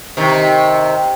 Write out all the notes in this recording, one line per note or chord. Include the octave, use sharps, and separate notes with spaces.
C3 D#3